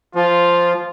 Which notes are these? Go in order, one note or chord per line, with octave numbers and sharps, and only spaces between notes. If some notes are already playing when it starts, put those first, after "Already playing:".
F3 F4